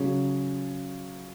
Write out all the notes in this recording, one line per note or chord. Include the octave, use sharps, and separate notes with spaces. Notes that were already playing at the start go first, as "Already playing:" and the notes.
Already playing: C#3 F#3 C#4 G#4